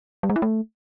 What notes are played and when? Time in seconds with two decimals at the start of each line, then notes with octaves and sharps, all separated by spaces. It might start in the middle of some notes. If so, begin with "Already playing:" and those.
0.23 G3
0.30 G#3
0.36 E4
0.42 A3